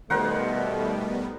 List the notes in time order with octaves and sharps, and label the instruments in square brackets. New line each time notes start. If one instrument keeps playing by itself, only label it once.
[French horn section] B2 A3 [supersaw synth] D#3 G3 B3 [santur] A#4 C5 F#5